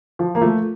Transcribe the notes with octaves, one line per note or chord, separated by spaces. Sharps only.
F3
A#3
F3 A3